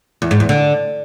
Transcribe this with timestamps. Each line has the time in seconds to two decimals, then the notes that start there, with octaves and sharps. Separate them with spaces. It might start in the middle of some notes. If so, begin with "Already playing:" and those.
0.22 E2
0.31 G#2
0.40 E2
0.49 D3